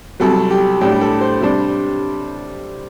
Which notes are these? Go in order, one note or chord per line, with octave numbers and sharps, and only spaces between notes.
C2 C3 F#3 A4
G4
A2 G3 D4 G4
G4
A4
C5
C3 G3 D4